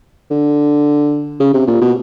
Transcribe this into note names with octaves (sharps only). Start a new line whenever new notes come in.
D3
C#3
C3
A#2
B2